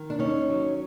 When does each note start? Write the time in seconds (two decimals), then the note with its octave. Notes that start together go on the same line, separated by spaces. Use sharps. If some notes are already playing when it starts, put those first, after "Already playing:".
Already playing: D#3
0.10 D4
0.19 D#2 C#4 D#4
0.49 F#3